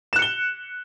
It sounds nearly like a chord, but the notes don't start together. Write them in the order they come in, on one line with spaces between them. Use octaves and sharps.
E7 F#6 C#7 G7